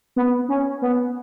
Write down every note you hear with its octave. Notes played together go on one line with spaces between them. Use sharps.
B3
C#4
B3